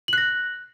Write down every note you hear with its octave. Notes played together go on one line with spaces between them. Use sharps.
F#6 A#6 F#7